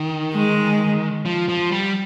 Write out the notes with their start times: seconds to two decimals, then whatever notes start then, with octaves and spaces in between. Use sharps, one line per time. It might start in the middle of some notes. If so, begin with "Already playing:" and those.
Already playing: D#3
0.35 G#3
1.25 F3
1.49 F3
1.72 G3